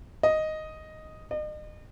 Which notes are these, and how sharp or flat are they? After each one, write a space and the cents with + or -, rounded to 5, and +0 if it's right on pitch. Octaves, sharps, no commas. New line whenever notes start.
D#5 +0
D#5 -40